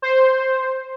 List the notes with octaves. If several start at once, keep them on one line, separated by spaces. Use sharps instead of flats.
C5